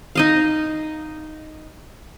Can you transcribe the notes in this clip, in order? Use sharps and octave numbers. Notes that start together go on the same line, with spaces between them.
D#4 D#5 F5